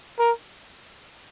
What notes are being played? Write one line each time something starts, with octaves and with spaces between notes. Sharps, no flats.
A#4